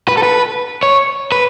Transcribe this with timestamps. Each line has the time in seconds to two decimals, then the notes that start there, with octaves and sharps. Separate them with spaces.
0.08 B4
0.17 A4
0.23 B4
0.83 C#5
1.32 B4